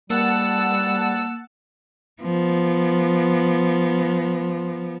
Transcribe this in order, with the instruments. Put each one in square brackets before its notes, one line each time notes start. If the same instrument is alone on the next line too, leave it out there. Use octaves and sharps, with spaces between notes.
[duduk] G3 [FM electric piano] A#3 [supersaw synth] F#5 A5 [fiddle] E6
[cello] F3 B3